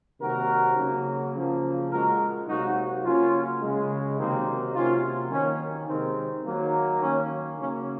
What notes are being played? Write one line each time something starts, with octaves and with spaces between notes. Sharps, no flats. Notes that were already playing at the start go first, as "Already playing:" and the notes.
C3 D#3 F#3 A#3 F#4 A#4
C#3 F#3 A#3
C#3 F3 A#3
A#2 G#3 F#4 A#4
C3 F#3 A#3 D#4 F#4
C#3 F#3 A#3 C#4 F4
C#3 G#3
C3 D#3 F#3 A#3 C4 D#4
C3 F#3 A#3 C#4 F4
D#3 A#3 C#4
C3 D#3 G#3 C4
D#3 F#3 A#3
D#3 A#3 C#4
C#3 F#3 A#3 C#4